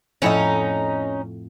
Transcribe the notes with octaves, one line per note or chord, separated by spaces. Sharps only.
F2 A2 C#4 D#4 E4